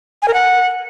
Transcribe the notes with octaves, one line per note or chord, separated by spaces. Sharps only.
G#5
A#4
F#5